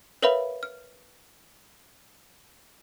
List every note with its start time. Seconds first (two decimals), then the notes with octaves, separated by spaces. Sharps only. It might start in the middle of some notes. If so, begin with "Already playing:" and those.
0.23 A#4 B4 C#5 E5 F5 B5
0.63 F6